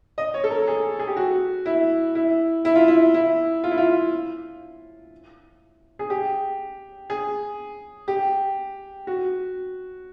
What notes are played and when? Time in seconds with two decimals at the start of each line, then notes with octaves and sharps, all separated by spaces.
0.18 D#5
0.34 C#5
0.44 A4
0.50 A#4
0.68 G#4
0.99 G#4
1.07 G4
1.16 F#4
1.66 E4
2.15 E4
2.65 E4
2.76 F4
2.88 E4
3.14 E4
3.64 F4
3.71 E4
3.78 F4
5.99 G#4
6.10 G4
7.10 G#4
8.08 G4
9.07 F#4